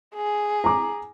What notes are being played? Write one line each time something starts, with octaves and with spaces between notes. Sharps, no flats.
G#4
A#5 D6